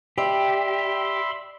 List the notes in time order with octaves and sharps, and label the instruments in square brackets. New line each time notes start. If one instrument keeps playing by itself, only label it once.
[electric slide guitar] G4 [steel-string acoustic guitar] D5 [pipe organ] E5 B5 C6